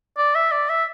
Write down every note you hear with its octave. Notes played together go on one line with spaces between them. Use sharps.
D5
E5
D5
E5